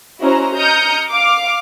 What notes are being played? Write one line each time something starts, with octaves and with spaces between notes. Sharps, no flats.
C#4 E4 F#4 C5 D#5 A#5
D#5 A#5 D#6 F6 G6 C#7
F5 D6